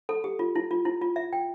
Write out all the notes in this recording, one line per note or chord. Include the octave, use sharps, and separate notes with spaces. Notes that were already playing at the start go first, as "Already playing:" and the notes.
A4
G4
F4
E4
F4
E4
F4
E5
G5